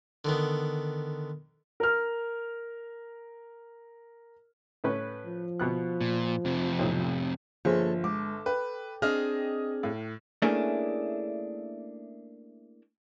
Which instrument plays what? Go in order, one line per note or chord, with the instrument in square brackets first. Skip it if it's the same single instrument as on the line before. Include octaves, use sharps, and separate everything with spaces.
[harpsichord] D3 D#3 B3
[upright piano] A#4 F6
[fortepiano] A2 C#4 B4
[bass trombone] F3
[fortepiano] B2 B3 F#6
[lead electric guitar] A#2
F2 C3
[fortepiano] B1 A2 D#4
[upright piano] G1 [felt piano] F3 [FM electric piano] A#3 G#4 C5 [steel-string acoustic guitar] A4 C#5
[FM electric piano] G#3 [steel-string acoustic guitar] A4 [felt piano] D6
[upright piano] B4 [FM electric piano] G5
[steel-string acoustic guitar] C4 D4 G#4 [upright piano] D#5 F6
[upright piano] A2
[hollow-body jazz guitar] A3 A#3 C#4 D4 E4 G#4